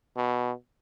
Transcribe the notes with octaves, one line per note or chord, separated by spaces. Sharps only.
B2